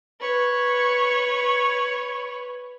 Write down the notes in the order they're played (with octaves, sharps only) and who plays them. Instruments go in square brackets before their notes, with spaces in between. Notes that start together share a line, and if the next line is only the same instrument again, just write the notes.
[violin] B4 C#5